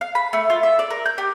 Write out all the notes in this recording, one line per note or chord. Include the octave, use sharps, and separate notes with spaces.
F5
B5
A3
F4
E5
D5
A#4
G6
G4